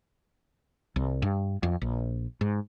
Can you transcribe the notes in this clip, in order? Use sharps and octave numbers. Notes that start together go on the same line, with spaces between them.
C2
G2
F2
A#1
G#2